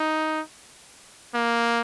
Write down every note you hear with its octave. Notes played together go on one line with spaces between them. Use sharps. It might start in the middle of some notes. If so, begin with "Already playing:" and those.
Already playing: D#4
A#3